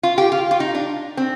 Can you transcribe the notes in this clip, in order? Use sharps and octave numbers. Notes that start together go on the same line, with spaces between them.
F4
G4
F4
F4
D#4
D4
C4